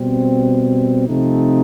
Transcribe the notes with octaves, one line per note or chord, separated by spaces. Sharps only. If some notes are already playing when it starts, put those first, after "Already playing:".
Already playing: B2 G3 C4
C3 F3 A3 C4 D#4